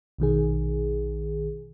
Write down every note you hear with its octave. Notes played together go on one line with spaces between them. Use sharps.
A#1 B2 D#3 G#4